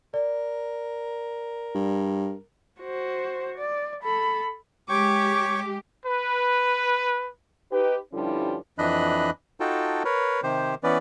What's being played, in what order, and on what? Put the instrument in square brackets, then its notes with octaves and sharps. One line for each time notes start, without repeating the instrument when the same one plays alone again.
[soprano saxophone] A#4 [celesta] D5
[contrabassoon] G2
[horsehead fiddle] F#4 C5
D5
A4 B5
[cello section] G#3 G4 [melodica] C#5 G5 C#6 [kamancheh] D6
[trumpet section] B4
[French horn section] D#4 G4 B4
G2 D3 F3 G3 C#4 E4
[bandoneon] F2 E3 D4 D#5 B5 F#6
D#4 F4 F#4 A4 G5 A5
A#4 B4 C#5
C3 D#3 G4 C5
E3 B3 C#4 B4 D5